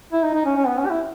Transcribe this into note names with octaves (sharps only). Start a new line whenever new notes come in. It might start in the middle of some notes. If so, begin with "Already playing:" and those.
E4
D#4
D#4
C#4
C#4
B3
C#4
G4
E4